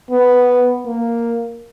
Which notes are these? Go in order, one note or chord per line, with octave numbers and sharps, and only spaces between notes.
B3
A#3